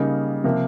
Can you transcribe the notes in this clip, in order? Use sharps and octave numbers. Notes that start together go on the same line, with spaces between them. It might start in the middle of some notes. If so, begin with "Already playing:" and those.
Already playing: C#3 G3 A#3 D#4
C3 F3 A#3